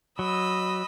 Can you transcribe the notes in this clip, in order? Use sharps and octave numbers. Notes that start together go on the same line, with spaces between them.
F#3 D#5 B5 E6